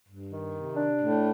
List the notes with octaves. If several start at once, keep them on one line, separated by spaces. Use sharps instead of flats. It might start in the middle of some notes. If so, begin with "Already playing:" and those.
G2
D#3
C3
D4
A2